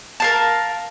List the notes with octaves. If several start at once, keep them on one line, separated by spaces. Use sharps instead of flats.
A#4 F5 A5